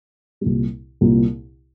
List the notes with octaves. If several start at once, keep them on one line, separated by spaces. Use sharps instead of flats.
C2 A#2 G3
C2 A#2 G3